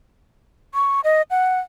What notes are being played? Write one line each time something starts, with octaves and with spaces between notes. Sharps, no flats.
C#6
D#5
F#5